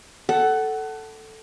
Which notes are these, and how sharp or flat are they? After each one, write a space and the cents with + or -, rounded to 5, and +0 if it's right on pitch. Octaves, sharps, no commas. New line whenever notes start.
A4 +0 F#5 +25